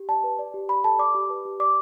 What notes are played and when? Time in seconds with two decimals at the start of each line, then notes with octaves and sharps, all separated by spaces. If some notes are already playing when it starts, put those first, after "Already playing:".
Already playing: G4
0.09 D5 A5
0.24 B4
0.39 D5
0.54 G4
0.69 D5 B5
0.84 A4 A5
0.99 D5 D6
1.15 G4
1.30 B4
1.45 G4
1.60 D5 D6